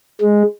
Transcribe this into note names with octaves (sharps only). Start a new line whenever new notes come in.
G#3